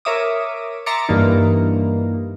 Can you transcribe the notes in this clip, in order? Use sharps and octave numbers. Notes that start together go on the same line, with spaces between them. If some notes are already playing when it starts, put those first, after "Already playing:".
A#4 C#5 E5 D6 D#6
E5 A#5 C6 D6 A6 C#7
G2 E3 A#3 D#4